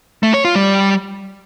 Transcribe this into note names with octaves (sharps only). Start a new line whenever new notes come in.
A3
C#5
F4
G3